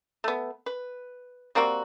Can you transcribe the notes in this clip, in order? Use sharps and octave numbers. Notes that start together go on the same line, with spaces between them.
A3 B3
B4
G3 A#3 C4 F#4